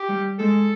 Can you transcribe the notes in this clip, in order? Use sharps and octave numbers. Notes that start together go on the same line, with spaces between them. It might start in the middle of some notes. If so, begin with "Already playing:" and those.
Already playing: G4
G3
G#3 A4